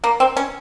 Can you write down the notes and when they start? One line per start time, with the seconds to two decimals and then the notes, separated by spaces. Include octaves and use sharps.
0.04 A#3
0.20 C4
0.37 C#4